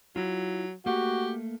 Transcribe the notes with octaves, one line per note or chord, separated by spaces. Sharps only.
F#3 E4 F4
A3 A#3 F#4 G4